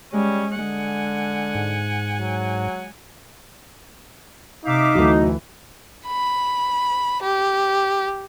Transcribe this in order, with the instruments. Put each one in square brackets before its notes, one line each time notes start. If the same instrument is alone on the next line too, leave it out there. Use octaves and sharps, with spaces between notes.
[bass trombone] G3 [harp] G#3 [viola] C#4
[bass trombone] D3 [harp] G#3 [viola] F#5 G#5
[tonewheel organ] G#2
[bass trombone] F#3
[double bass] C3 [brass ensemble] D#4 [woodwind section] E5 F5 D6
[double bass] D2 E3 [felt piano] F#3 A3
[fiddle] B5
G4